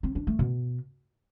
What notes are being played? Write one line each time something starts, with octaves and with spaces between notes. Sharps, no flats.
C4
D4
A3
B2